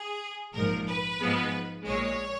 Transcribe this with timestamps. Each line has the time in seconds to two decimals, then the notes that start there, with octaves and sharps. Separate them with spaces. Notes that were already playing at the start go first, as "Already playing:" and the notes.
Already playing: G#4
0.54 A#1 G#2 F3 A#4
0.87 B4
1.21 G#2 F3 G#3 B3
1.86 A#1 A#2 G#3 C#5